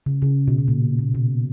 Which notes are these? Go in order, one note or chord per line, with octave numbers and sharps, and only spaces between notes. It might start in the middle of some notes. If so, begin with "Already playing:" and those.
C#3
C#3
B2
B2
A#2
A#2
B2